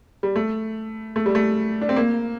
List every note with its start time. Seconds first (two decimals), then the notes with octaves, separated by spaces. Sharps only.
0.23 G3
0.36 A3
1.16 A3
1.26 G3
1.35 A3
1.81 D4
1.89 C4
1.96 A#3